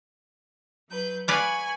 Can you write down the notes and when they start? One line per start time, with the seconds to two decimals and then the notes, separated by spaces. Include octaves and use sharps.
0.90 F#3 B4 G6
1.28 B4 D5 F5 G#5 B5 C#6